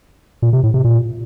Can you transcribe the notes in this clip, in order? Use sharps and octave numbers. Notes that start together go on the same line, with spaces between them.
A#2
C3
A2
C3
A#2